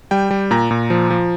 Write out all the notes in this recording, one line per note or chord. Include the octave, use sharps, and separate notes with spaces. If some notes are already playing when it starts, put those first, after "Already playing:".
G3 G5
G3
A#2 A#5
A#2
F3
F3